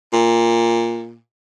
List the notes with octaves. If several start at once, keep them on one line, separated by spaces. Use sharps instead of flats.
A#2